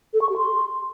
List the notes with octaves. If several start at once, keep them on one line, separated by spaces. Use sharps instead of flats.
A4
C#6
G4
C6